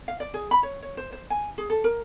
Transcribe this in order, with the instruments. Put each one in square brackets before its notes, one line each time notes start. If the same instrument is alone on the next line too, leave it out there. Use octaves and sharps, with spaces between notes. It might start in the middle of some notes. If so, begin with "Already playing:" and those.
[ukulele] F5
D5
G#4
B5
C#5
C#5
C5
C5
G#5
G#4
A4
A#4